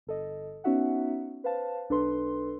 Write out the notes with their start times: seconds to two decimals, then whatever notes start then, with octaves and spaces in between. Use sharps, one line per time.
0.07 G1 A4 D#5
0.64 B3 C#4 D#4 F#4 E5 F#5
1.44 B4 C5 F5 A5
1.89 B1 D4 A4 B4 C6